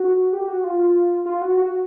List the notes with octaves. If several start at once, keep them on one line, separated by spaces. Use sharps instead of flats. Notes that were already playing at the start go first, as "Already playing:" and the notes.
Already playing: F#4
G4
F#4
F4
F4
F#4
F#4